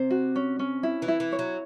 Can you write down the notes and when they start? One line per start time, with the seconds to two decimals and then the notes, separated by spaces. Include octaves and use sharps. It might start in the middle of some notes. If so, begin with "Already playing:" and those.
Already playing: C3 C5
0.10 F#4
0.36 C#4
0.59 C#4
0.83 E4
1.02 E3
1.08 E4
1.20 E3
1.32 C#5
1.39 F#3